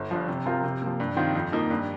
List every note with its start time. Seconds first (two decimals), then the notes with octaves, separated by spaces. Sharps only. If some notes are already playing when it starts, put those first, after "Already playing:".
Already playing: G1
0.11 G2 F3
0.28 C3
0.46 F3 C4 F4 A#4
0.64 C3
0.82 F3 A#3
1.00 G2
1.17 D#3 C4 F4
1.35 F2
1.52 F3 A#3 D#4
1.70 G2